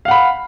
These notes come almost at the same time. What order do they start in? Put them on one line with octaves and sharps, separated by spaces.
F5 F#5 B5